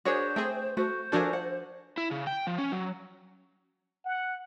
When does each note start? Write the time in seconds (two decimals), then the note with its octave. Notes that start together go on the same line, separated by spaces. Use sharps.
0.05 D4 F#4 G#4 A#4 C5 C#5
0.36 A3 C4 G#4 G5
0.77 A3 F#4 C5
1.12 F3 D4 F#4 A4 A#4 G#5
1.33 F#5
1.98 E4
2.11 C#3
2.27 G5
2.47 F3
2.58 C#4
2.72 F#3
4.05 F#5